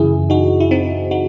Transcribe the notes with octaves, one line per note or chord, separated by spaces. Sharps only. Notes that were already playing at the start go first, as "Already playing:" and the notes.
Already playing: F#2 C#3 E3 E4 G#4
D#4 F#4
E4
C4 D#4
D#4 F#4